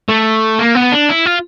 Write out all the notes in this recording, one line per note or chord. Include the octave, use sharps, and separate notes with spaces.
A3
A#3
B3
D4
E4
F4